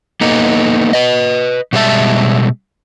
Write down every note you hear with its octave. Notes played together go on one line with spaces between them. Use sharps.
A#3 B3 D#4 A4
B4 D#5
B2 G3 G#3 C#5 E5 A5